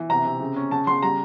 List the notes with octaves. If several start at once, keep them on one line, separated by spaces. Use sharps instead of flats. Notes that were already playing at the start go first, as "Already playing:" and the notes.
Already playing: E3
C3 A#5
C3
C#3
C#4
C#3 A5
C#3 C6
G3 A#5